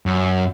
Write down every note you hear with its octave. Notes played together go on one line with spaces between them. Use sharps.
F#2